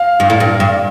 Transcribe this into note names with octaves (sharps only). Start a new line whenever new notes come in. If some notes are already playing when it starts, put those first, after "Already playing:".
Already playing: F5
G2
A2
G2
G2